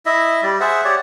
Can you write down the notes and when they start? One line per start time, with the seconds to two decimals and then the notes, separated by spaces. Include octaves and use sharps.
0.06 E4 D#5 E5
0.43 G3 D5
0.60 G#4 C5 E5 F#5
0.85 G4 C#5 D5 F#5